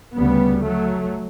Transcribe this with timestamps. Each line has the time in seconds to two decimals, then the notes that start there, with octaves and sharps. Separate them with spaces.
0.16 D2 C#3 G3 B3
0.64 F#3 A3